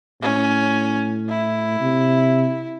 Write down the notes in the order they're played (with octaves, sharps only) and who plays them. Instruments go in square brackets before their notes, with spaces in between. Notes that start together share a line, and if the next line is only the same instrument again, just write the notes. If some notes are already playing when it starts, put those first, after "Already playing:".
[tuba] A2 [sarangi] C#4
[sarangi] E4
[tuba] C3